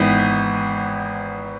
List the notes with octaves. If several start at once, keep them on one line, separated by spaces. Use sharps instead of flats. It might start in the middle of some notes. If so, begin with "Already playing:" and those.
Already playing: G#1 G#2 E3 B3